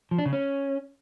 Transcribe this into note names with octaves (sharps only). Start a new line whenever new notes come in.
F3
D4
C#3
C#4